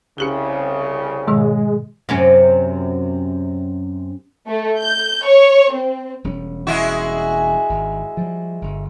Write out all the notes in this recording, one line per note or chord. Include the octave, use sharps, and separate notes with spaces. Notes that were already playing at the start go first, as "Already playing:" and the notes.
C2 C#3 C#4 G4 G#4
G#2 B2 D#3 G#3
F#2 C3 C#4
A3
G6
C#5
C4
E1 G3 C#4
G#3 E4 F#4
G#1
F3 G3
G1